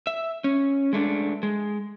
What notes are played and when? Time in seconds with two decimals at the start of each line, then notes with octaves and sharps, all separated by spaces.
0.07 E5
0.44 C#4
0.93 G#3 A3 D4
1.43 G#3